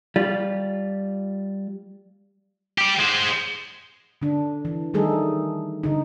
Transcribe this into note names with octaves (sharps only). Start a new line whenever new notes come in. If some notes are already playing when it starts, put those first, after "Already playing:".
G3 F4
G4 D5
G#3 C5
D3 D4
E3
D#3 G3 A3 D#4 G#4 A4
D3 D#4